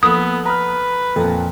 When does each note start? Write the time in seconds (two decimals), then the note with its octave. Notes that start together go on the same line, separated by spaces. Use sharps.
0.03 F3 A#3 B3 A4 D#6
0.45 B4 A#5 F6
1.16 F2 A#2 A4 A5 A#5